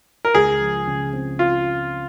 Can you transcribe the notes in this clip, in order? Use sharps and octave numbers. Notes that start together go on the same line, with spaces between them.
A#4
C#2 G#4
F3
C#3
C4
F4